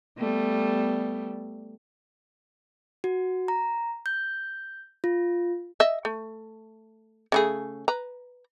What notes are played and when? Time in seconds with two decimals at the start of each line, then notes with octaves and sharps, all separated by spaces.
0.18 G3 A3 B3
3.04 F#4
3.48 A#5
4.06 G6
5.04 F4
5.80 D#5 E5
6.05 A3
7.32 C#3 A3 G#4
7.88 B4 A#5